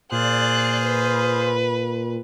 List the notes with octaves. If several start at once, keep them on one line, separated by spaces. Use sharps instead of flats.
A#2 F4 G#4 C5 D5 F#6
B4